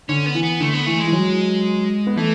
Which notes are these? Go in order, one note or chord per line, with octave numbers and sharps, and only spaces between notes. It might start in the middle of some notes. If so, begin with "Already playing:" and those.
D3 C#4
B3
E3
B3
D3 A3
B3
E3 A3
G#3
E3
F#3
B3
E3 A3